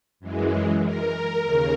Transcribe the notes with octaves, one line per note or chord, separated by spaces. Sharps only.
F#2 E3 G#3
A#4
D#2 C#3